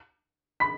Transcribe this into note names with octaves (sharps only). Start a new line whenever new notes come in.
B5 B6